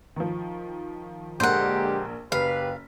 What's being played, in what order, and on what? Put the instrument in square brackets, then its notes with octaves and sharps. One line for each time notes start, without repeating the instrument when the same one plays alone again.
[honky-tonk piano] D#3 F3
[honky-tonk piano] A#1 A#4 [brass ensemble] D3 G#3 G4 [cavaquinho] C5 F#5
[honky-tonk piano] F#1 B6 [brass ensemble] G4 B4 [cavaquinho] F5